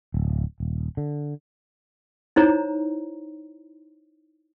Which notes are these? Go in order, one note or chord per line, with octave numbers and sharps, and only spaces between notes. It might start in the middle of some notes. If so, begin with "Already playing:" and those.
D1
D#1
D3
D#4 E4 C5 C#5 A#5